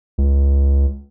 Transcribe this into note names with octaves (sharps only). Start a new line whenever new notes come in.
C#2